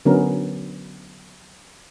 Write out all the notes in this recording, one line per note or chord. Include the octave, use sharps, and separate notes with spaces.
D3 F#3 B3 C#4 A#4